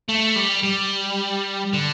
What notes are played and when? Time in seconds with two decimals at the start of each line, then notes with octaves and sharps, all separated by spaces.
0.09 A3
0.36 G3
0.63 G3
1.73 D3